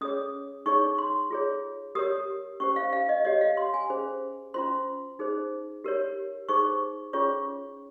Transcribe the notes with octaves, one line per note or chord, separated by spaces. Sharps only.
C#4 G#4 C#5 D#6
D#4 G#4 C#5 C#6
C6
F4 G#4 C#5
G4 A#4 C#5 D#6
C#4 G4 C5 C#6
F5
F5
D#5
G4 C#5 D#5
F5
C6
G#5
C#4 G#4 C5
C#4 F4 C5 C6
D#4 G#4 C5
G4 A#4 C#5
D#4 G#4 C5 C#6
C#4 F4 G#4 C#5 C#6